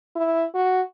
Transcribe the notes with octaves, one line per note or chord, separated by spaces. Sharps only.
E4
F#4